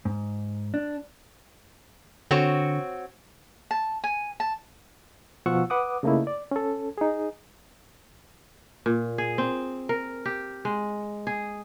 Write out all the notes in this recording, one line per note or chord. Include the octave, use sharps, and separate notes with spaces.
G#2
D4
D3 C4 F#4 C#5
A5
G#5
A5
B2 F3 F4 F#5 C#6 E6
B4 F#5 D6 D#6
C#3 A3 A#3 D#4 E4
D5
C#4 A4
D#4 G#4
A#2
G#4
C4
A#4
G4
G#3
G#4